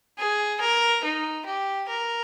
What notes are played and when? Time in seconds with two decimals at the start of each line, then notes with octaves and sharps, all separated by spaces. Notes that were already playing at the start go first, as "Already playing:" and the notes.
0.19 G#4
0.61 A#4
1.04 D#4
1.46 G4
1.89 A#4